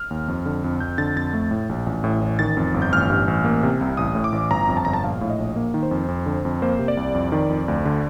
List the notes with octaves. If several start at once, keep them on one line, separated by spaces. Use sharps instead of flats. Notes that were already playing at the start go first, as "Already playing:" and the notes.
Already playing: F6
D#2
F2
D3
F2
F2 G6
D3 A6
F2 A6
A3
A2
A#1
A1
A2
A1
D#3 A6
F2
G1
G6
A1 F6
G2
A1
A#3
C3
C2
A1 D#6
A2
D6
A1
G1 A#5
F2
A5
G1 A#5
A5
A#1 F5
A2
D#5
A#1
A#3
D#3
C5
F2
F2
D3
F2
A#3 C5
C3
D5
C2
F2
D#3
F2
D2
D3